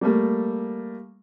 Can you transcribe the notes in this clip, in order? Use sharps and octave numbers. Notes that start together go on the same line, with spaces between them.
G3 A3 A#3